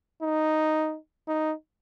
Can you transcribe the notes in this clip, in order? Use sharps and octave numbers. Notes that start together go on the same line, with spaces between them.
D#4
D#4